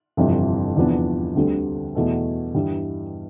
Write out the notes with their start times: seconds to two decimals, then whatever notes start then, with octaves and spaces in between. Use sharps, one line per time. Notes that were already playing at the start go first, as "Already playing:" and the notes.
0.17 G1 F2 C3 E3
0.76 E2 C3 F3 B3 D4
1.35 D2 D3 G3 C4
1.95 E2 B2 A3
2.54 G2 E3 G3